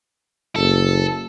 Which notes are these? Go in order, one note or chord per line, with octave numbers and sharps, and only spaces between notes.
F#1 A4